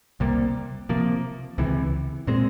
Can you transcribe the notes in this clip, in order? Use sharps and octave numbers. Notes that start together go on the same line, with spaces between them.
C2 C3 G3 A#3
C3 F3 A#3
C#2 C3 E3
A#2 G#3 C4